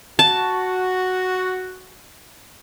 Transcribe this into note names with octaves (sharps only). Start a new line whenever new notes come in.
F#4 A5